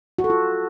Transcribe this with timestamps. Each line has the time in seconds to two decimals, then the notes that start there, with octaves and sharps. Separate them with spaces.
0.19 F#4
0.24 A4
0.30 F4